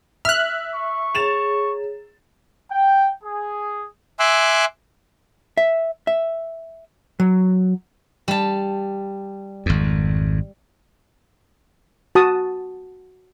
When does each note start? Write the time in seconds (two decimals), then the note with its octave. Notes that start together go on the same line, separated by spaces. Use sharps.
0.25 E5 F6 F#6
0.74 C#6
1.15 G#4 C#5 A#5 A6 E7 F7
2.71 G5
3.23 G#4
4.20 E5 G#5 C6 D6 E6 F#6
5.57 E5
6.07 E5
7.20 F#3
8.28 G3 A5
9.66 G#1 F2
12.15 F#4 A5 D#6